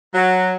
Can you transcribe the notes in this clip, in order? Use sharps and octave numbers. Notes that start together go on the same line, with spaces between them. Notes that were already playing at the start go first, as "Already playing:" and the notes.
F#3